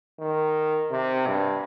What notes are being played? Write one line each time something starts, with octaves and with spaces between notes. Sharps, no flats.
D#3
C3
G2